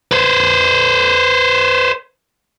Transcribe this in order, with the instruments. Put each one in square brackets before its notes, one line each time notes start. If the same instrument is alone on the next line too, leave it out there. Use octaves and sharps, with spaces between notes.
[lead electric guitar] B4 C5